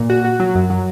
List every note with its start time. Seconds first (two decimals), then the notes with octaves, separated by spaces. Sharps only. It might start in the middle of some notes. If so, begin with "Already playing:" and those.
Already playing: A#2
0.10 F#4
0.25 F#4
0.40 F#3
0.55 F#2
0.70 F#3